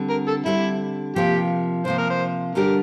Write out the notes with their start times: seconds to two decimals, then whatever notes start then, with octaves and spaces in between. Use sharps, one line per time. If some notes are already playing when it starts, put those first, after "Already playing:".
Already playing: D3 G3 C4
0.10 A#4
0.28 A4
0.46 D3 G3 C4 E4
1.16 C3 F3 A#3 G4
1.85 C3 F3 A#3 C5
1.98 A#4
2.10 C5
2.55 D3 G3 D4 G4 A#4